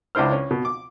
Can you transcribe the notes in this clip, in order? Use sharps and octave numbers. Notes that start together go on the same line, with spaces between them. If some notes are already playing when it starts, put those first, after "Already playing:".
C#2 D4 E4 C5 F6
C#4
B2
D6